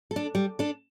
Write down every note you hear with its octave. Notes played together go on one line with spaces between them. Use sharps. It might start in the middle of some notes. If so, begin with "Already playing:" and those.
A4
D4
G3
D4 A4